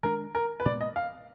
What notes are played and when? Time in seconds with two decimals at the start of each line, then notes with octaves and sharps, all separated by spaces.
0.03 D#3 G#3 D4 A#4
0.35 A#4
0.60 B4
0.65 A#2 G#3 B3 D5
0.81 D#5
0.96 F5